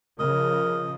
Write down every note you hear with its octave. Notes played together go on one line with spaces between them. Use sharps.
C#3 F3 A#4 D#5